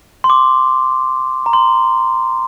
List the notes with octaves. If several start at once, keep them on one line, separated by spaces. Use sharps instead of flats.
C6
D6
A#5
C6